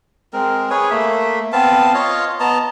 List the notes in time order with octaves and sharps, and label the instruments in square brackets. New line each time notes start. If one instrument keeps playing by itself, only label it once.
[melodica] G#3 C4 A#4
G#4 B4 C#5 G#5
A3 A#3 E5
B3 C4 F5 A5
F4 C#5 D#5 F5
B3 D#5 A5 A#5